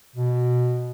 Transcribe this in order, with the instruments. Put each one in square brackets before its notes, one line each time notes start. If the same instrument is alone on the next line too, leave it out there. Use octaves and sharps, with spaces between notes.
[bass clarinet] B2